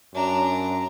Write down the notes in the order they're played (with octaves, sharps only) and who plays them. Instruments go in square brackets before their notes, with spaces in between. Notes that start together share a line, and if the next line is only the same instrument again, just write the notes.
[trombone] F#2 [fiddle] D4 A#5